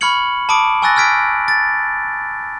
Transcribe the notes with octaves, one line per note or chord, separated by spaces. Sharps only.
B5 C#6 F6 G#6 C#7 F#7
A5 B5 D6 D#6 D7
G#5 C#6 E6 F#6 A6 A#6
E6 F6 G#6 B6 D7
A6